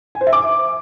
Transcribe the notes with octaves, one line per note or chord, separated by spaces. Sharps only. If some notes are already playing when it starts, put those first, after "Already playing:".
G#5
C5
E5
D6